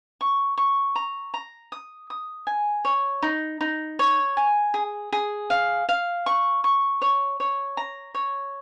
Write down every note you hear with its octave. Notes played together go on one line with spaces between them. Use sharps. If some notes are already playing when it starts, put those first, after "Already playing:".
C#6
C#6
A#5
A#5
D#6
D#6
G#5
C#5
D#4
D#4
C#5
G#5
G#4
G#4
F5
F5
C#6
C#6
C#5
C#5
A#5
C#5